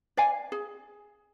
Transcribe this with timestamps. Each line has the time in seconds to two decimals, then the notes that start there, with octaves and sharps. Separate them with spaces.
0.17 D5 F5 G#5
0.52 G#4